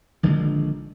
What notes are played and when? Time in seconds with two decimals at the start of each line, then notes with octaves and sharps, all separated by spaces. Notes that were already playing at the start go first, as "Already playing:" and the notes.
0.23 A#1 D3 D#3 G#3